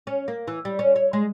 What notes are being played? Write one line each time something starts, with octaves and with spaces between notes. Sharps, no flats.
C#4
A#3
E3
G3
C#4
C#5
G#3